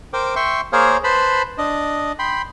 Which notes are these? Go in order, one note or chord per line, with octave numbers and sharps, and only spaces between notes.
A#4 C5 G5 D6
E5 G5 C6 C#6
A#3 G#4 A#4 C5 C#5 F5
B4 C5 A5 B5 C6
D4 D#5
G5 B5 C6